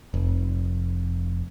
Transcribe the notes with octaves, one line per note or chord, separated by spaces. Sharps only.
F1